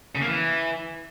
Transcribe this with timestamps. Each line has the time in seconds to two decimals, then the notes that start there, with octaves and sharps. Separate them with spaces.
0.15 C#3
0.21 A#3
0.27 E3